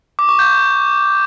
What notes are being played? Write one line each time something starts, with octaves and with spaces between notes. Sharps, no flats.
D6
C#6
G6